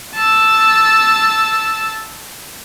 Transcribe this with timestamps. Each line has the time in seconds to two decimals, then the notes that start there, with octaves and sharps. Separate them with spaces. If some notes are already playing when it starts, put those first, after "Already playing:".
0.15 A5 E6